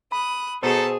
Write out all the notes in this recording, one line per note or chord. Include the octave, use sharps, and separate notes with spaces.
B5 D#6 F#6
B2 D#4 G#4 A4 C5 A5